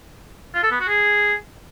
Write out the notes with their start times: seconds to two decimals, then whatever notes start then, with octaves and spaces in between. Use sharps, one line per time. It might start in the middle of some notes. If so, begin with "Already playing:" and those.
0.54 F4
0.63 A4
0.71 B3
0.80 F#4
0.88 G#4